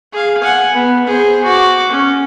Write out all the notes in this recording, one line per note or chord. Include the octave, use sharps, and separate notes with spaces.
G#4 F5
F#5 G#5
B3
G#4 C5
F#4 D6
C#4